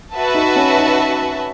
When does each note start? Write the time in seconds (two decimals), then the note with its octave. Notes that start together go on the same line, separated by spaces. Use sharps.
0.13 F#4 B4 E5 A5
0.34 D#4
0.56 C#4
0.78 D#4